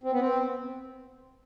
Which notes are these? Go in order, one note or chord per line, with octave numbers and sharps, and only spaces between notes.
C4
B3
C4